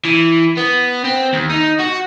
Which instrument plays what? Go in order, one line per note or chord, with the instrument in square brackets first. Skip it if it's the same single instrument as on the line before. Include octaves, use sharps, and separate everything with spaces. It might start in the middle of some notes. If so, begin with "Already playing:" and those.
[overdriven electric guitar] E3
B3
C4
D#2
D#4
F#4